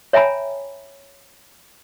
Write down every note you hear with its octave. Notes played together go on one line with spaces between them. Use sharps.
C#5 E5 G5 G#5 A#5 B5